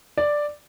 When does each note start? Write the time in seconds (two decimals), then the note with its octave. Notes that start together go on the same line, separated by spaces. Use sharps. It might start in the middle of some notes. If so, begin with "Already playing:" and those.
0.18 D5